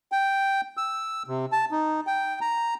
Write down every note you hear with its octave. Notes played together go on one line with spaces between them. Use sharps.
G5
E6
C3
A5
D#4
G5
A#5